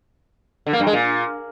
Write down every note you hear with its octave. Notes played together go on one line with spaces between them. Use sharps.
D3
A#3
G2
G#3
A#2